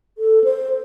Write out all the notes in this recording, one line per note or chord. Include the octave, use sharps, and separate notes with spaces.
A4
C5